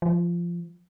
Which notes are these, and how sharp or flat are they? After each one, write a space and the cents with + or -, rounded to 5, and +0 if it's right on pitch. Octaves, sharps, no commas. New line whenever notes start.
F3 -15